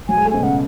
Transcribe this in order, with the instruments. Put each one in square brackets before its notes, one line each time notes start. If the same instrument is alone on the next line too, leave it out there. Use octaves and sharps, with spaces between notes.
[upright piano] F#3 [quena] G#5
[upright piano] G#3
A3
[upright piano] B2 [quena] G#5
[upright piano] C#3 [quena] F#5